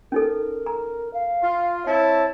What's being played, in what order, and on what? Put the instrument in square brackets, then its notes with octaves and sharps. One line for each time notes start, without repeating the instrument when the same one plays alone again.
[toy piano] C#4 D#4 A4 [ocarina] A#4
[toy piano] A#5
[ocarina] F5
[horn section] F4
[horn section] C4 E4 A5 [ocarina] C#5